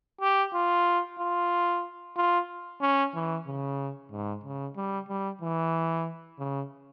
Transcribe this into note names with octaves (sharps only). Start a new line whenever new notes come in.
G4
F4
F4
F4
C#4
E3
C#3
G#2
C#3
G3
G3
E3
C#3